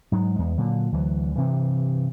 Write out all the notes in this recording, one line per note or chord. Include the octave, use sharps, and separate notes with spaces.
G#2 F#3 G#3
E2 G#3
A#2 D3 F#3
D2 E3 F#3
G2 C3 E3